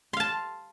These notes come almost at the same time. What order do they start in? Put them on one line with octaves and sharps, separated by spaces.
C6 F5 A5